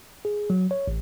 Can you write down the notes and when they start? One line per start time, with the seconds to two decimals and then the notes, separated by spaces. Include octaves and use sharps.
0.25 G#4
0.50 F#3
0.71 C#5
0.87 A1